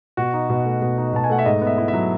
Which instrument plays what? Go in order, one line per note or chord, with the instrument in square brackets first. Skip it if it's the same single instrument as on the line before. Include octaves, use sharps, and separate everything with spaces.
[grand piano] B2 F#4
D#4
B2
A3
B2
D#4
B2 A5
G#5
A3 F#5
E5
G#2 D#5
B3
E5
E4
E5
F#3